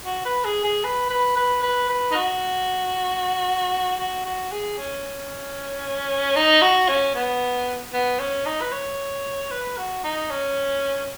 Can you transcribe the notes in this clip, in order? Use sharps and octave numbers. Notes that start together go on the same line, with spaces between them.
F#4
B4
G#4
G#4
B4
B4
B4
B4
B4
D#4
F#4
F#4
F#4
G#4
C#4
D#4
F#4
C#4
B3
B3
C#4
D#4
B4
C#5
B4
F#4
D#4
C#4